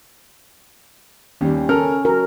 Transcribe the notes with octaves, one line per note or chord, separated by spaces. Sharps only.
D#2 G3 C#4
C#4 A4 A#4 F6
F#3 A#4